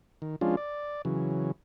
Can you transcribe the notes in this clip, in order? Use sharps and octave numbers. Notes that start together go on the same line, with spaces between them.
D#3
F3 G#3 C#4 D4 F4
D5
C#3 E3 F#3